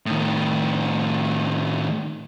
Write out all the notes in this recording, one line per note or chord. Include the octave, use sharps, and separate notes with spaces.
A2 D#3